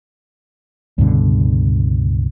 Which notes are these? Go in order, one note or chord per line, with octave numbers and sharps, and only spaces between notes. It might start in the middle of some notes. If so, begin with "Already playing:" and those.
C#2 G2 B2 D3